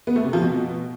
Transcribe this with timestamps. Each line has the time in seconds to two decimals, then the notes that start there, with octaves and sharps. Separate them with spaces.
0.07 B3
0.16 A3
0.25 C3
0.33 F3
0.42 B2